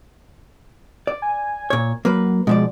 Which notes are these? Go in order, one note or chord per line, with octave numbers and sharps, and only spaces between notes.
D5
G#5
A#2 C#5
F#3 A#3 B4
B2 F3 G#3 D5